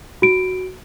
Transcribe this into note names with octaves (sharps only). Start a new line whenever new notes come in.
F#4 D7